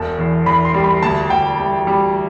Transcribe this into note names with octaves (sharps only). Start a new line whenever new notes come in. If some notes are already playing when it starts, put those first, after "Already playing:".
Already playing: E1 A5
E2
E2 B5
C6
G3
B5
D2 A5
D2 G5
G3
G3